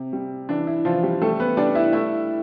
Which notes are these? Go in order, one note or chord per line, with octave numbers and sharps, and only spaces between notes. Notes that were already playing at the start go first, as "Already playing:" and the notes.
Already playing: C3
G3
E3 D4
E4
E3 F3 F4
G3 G4
G3 A3 A4
B3 B4
G3 D4 D5
E4 E5
A3 E4 E5